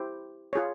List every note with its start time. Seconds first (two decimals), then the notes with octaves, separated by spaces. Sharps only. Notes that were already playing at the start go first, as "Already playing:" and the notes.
Already playing: E4 G4 C5
0.53 F4 G#4 C#5